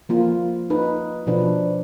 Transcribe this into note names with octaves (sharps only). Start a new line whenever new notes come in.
F3 A#3 F4
D#4 B4
B2 F3 D4 B4